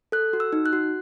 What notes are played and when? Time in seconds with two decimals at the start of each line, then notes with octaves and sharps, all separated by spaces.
0.12 A4 F#6
0.33 F#4
0.40 E6
0.53 D#4
0.66 F#6
0.73 F#4